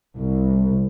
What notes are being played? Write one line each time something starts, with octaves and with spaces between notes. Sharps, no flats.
C2